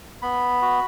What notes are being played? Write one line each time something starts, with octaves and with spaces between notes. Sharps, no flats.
B3 B5
F#4